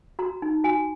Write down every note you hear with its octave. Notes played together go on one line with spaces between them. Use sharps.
F#4 A#5
D#4
F#4 G#5